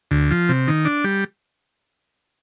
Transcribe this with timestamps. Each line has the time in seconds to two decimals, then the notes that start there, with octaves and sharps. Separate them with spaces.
0.11 D2
0.31 F3
0.49 C3
0.67 D#3
0.85 D4
1.04 G3